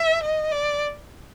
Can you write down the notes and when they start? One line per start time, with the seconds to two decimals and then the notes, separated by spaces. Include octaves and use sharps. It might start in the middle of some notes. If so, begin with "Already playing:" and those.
Already playing: E5
0.23 D#5
0.51 D5